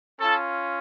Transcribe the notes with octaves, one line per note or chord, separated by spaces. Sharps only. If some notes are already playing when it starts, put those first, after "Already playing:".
C#4 F4 A4 A5